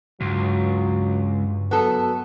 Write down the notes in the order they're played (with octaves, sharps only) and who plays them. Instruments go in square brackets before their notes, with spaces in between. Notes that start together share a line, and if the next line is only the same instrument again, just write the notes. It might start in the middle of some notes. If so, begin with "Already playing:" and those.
[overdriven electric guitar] C#2 [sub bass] G2 [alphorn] F#3
[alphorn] F#3 [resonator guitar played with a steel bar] B3 A4